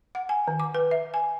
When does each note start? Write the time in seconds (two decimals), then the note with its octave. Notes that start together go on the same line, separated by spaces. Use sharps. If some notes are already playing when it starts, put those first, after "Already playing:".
0.15 F#5
0.29 G#5
0.48 D#3
0.60 D6
0.75 B4
0.91 E5
1.14 G#5